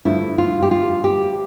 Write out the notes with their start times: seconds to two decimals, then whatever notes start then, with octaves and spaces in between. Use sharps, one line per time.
0.05 G2 D3 F3 A3 E4
0.38 F4
0.62 G4
0.71 F4
1.04 G4